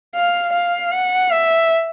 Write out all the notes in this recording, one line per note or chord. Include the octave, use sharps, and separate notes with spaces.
F5
F5
F#5
E5